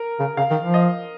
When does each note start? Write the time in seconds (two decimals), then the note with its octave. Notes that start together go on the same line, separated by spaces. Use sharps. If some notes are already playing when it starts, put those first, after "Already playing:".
Already playing: A#4
0.20 C#3
0.37 C#3 F5
0.51 D#3
0.62 F3
0.74 D#5